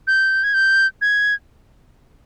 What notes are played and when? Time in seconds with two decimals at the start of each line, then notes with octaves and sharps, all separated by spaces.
0.07 G6
0.44 G#6
0.54 G6
1.02 G#6